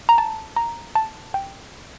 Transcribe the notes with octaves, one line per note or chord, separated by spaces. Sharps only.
A#5
A5
A#5
A5
G5